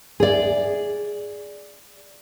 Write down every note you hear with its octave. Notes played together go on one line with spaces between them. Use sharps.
G#4 D5